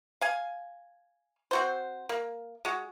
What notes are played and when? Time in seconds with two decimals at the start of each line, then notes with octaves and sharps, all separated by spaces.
0.21 F5 G#5
1.51 C4 F#4 C5
2.09 A#3
2.65 G#3 F#4